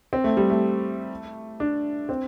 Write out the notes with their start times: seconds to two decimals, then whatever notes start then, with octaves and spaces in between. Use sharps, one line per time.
0.13 C4
0.24 A3
0.37 G3
0.50 A3
1.60 D4
2.09 C4